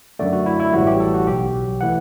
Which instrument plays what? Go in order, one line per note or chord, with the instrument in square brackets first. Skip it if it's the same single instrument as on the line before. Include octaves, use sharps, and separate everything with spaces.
[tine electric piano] F#2 D3 A3 D5
F#4
E4
E4
A1 A2 E3 G3 F#4
G4
A4
F#4
B1 B2 F#3 G4
E3 A3 F#5